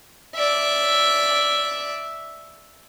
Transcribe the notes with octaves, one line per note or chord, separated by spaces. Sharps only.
D5 E5